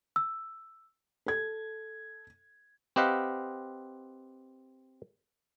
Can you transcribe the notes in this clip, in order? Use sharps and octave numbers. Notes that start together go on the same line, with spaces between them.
E6
A4 G#6
C4 G4 B4 D#5 F5 F#5